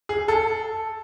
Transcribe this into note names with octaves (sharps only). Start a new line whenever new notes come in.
G#4
A4